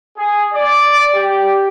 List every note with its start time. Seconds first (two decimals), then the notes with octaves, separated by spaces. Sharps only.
0.17 G#4
0.53 D5
1.15 G4